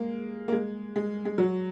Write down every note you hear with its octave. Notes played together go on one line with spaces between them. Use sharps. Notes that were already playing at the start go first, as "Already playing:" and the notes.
Already playing: G#3 A#3
A#3
G#3
G#3
G#3
F#3